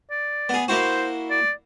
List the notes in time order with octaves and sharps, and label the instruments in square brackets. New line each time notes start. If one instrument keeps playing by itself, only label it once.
[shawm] D5
[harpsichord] B3 G#4
[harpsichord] A#3 E4 F#4 [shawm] C5
[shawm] D5